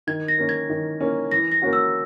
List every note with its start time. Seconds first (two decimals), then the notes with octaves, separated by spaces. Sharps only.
0.07 D#3 G#6
0.28 A#6
0.38 A#3 C#4
0.49 G#6
0.69 D#3
1.00 A#3 C#4
1.31 E3 A#6
1.52 A#6
1.62 A#3 C#4 F#4
1.73 E6